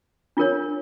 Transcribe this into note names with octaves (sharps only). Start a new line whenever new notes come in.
D4 F4 A#4 C#5